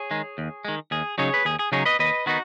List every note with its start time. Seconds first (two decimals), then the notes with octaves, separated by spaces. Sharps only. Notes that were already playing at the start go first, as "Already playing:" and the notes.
Already playing: G#4 C#5
0.11 D#3 G#3
0.38 D#2
0.65 D#3 G#3
0.91 D#2 G#4
1.18 C#3 F#3 D#4 G#4 C#5
1.34 B4
1.45 D#2 G#4
1.59 G#4
1.72 C#3 F#3 D#4 G#4 C#5
1.85 B4 D#5
1.99 D#2 B4 D#5
2.26 D#3 B3 D#4 F#4